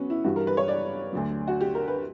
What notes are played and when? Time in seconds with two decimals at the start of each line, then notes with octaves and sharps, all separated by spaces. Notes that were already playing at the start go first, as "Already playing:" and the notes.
Already playing: F#3 B3 C#4
0.10 E4
0.24 G2 E3 G3 F#4
0.36 A#4
0.47 B4
0.57 C#5
0.68 D5
1.13 D2 D3 F#3
1.48 F#4
1.61 G4
1.75 A#4
1.88 B4